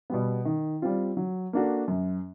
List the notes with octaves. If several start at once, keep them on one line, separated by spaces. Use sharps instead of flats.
B2 G3 B3
D#3
G3 C4 F4
F#3
A#3 D4 F#4 A4
F#2